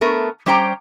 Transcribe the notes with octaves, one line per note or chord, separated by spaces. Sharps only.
A3 B3 A#4
G3 C#4 G4 C5 G5 A#5